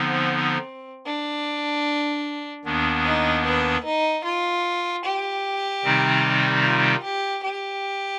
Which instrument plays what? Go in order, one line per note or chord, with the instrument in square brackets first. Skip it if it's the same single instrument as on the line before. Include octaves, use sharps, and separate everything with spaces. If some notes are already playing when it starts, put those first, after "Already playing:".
Already playing: [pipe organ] D3 F3 B3 D#4 [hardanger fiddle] C4
[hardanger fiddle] D4
[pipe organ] D#2 D#3 B3 D4
[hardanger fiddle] D#4
B4
D#4
F4
G4
[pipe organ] C3 D#3 G3 C4 D#4
[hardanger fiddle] F4
G4
G4